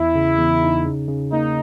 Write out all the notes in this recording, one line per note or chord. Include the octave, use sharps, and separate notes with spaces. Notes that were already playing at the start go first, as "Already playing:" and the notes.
Already playing: E2 E4
C#3
E2
D#4
C#3
C#3
A#3 D#4